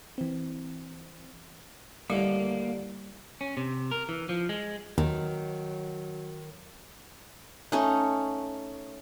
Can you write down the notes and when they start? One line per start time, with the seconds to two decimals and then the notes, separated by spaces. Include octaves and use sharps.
0.18 E3 C4
2.10 D#2 A2 D3 G3 A#3
3.41 C#4
3.57 C3
3.92 A#4
4.09 E3
4.29 F3
4.49 G#3
4.98 D#2 D#3 F#3
7.72 A3 C#4 D#4